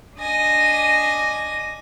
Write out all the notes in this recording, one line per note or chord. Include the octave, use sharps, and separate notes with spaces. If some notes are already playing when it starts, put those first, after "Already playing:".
D4 D#5 G#5 A#6